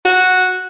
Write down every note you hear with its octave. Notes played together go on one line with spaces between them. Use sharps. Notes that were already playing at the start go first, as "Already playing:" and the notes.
F#4